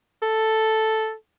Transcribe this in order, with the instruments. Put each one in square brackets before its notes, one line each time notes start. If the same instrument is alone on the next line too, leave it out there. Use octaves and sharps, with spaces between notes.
[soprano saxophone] A4